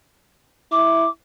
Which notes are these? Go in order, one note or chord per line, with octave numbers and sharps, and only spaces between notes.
E4 D6